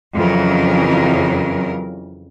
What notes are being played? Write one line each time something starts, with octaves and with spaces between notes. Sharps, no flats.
F2 C#3 E3 F#3 A#4